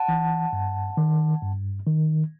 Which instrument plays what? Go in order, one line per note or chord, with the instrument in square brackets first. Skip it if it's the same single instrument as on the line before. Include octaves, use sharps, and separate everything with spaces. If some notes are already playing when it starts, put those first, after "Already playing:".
Already playing: [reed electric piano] F#5 A5
E3
G2
D#3
G2
D#3